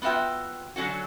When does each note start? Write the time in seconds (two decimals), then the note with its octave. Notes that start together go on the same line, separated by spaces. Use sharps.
0.02 B3 F4 F#4 E5 G5
0.76 D3 F#3 C#4 F#4